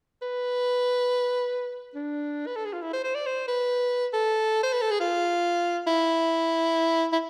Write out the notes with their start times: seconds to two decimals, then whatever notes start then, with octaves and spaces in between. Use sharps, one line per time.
0.22 B4
1.95 D4
2.47 B4
2.56 A4
2.65 G#4
2.73 F4
2.82 E4
2.93 C5
3.04 C5
3.15 D5
3.26 C5
3.48 B4
4.13 A4
4.63 C5
4.73 B4
4.82 A4
4.91 G#4
5.00 F4
5.87 E4
7.13 E4